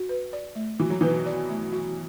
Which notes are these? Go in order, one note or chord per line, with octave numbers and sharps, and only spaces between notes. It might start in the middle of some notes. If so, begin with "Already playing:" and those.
Already playing: F#4
B4
D5
A3
E3 F#4
F#3
B2 E3 B4
D5
A3
F#4